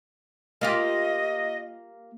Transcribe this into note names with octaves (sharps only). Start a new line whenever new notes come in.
A#3 F4 G4 D#5